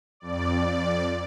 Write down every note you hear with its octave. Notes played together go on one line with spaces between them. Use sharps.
F2 D5